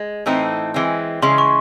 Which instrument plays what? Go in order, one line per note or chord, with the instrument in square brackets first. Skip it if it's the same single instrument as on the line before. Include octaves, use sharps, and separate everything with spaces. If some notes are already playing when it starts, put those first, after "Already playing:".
Already playing: [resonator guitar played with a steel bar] G#3
A2 E3 A3 C4 D#4
E3 G#3 C4
[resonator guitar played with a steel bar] C#3 E3 G#3 [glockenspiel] C6
[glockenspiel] C#6